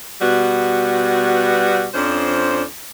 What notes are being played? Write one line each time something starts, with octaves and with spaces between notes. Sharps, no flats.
B2 G3 B3 F#4
F2 F3 C#4 D4 C5